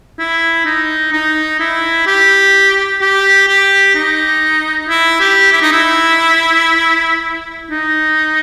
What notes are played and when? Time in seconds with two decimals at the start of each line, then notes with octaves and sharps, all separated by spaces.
0.19 E4
0.65 D#4
1.12 D#4
1.59 E4
2.06 G4
3.01 G4
3.48 G4
3.95 D#4
4.88 E4
5.20 G4
5.52 E4
5.61 D#4
5.72 E4
7.71 D#4